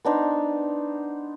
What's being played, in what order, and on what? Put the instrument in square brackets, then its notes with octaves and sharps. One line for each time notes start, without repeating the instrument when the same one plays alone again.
[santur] B3 D4 D#4 C5